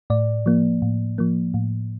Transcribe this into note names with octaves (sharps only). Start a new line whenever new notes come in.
A2 D5
F3 A#3
A2
F3 A#3
A2